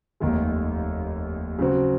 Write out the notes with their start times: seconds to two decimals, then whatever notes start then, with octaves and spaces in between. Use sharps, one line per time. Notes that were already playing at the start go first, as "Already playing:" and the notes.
0.20 F1 D#2 D#3 G#3
1.58 C#3 F#3 C4 F#4